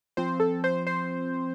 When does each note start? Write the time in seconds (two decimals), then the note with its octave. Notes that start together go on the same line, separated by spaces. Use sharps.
0.17 F3 C4 C5
0.40 A4
0.64 C5
0.87 C5